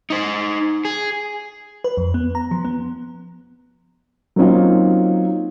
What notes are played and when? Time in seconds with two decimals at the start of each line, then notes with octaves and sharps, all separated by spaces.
0.10 D#4 C5
0.85 G#4
1.84 B4
1.97 F2
2.14 B3
2.35 A#5
2.51 F3
2.65 B3
4.36 F#3 A#3 C4 C#4 D#4 F4